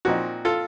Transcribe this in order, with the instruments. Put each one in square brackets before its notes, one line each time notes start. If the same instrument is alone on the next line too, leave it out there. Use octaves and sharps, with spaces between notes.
[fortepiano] A#2 F3 C4 D#4 F#4
F4 A4